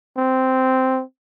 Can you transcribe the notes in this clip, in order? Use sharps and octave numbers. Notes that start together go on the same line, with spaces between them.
C4